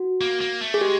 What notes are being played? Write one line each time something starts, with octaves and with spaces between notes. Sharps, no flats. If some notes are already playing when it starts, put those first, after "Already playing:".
Already playing: F#4
A#3
A#3
A3
G#4
G#3 G4